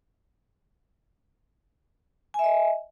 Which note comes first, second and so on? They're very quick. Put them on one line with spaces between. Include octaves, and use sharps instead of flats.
G#5 E5 D#5